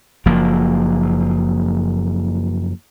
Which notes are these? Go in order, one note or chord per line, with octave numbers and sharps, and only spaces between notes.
F#1 F3 A#3